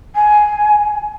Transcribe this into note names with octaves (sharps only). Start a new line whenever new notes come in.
G#5